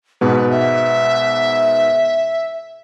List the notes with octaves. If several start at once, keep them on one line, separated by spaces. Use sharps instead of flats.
G#2 B2 B3 B4
E5